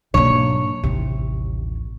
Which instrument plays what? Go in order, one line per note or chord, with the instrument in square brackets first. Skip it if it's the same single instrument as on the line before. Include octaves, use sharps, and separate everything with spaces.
[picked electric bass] G#2 F#3 D4 [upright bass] B2 A#3 [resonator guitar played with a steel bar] C#5
[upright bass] A1 D#2 [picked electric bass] C3